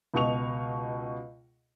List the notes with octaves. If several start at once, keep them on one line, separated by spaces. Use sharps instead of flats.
C#2 B2 D#5 C#6 F7